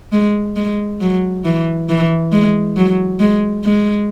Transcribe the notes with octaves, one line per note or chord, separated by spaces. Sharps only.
G#3
G#3
F#3
E3
E3
G#3
F#3
G#3
G#3